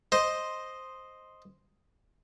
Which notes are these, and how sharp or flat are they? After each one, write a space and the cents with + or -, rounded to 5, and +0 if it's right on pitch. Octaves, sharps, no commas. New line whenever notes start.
C5 +0 D#5 +0